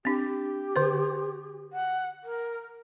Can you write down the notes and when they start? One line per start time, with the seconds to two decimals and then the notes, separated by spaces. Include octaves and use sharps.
0.05 C4 D4 G4
0.76 D3 C5
1.73 F#5
2.24 A#4